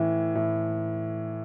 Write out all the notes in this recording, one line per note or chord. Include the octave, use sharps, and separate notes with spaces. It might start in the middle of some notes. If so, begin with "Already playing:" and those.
Already playing: A2 E3
A2